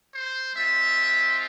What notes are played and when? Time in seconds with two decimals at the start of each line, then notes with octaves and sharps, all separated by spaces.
0.13 C5
0.55 G#3 C4 F4 E5